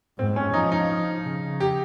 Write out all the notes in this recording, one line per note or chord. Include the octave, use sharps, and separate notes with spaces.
G#2 C4
C#4
F3 D#4
D#4
C#3
G4